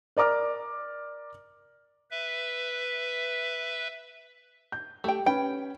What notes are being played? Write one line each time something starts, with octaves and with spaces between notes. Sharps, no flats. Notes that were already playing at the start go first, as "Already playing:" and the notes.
A#4 D5 A#5 D6 F6
B4 E5
G6
A3 G4 G5
C#4 B4 G5 B5